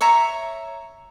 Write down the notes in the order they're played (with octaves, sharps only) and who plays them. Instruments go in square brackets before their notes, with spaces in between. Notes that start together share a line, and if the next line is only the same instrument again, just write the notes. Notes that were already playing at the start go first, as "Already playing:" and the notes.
[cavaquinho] C#5 E5 A#5 C#6